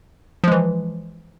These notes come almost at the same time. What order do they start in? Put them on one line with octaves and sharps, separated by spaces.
F3 G#3 E3